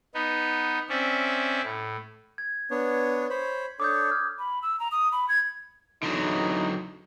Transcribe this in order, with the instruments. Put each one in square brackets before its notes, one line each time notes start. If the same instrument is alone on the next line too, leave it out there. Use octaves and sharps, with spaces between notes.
[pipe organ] B3 D#4
C4 C#4 D5 E5
A2
[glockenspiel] G#6
[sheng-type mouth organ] B3 D4 C#5
C5 C#5 B5
[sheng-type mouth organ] D4 A4 C#5 [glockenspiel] D6 D#6 G6
[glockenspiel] F6 G#6
[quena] B5
E6
A#5
D#6
B5
G#6
[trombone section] E2 E3 D#4 [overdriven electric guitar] D3 F#3